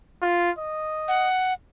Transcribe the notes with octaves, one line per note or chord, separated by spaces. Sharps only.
F4
D#5
F#5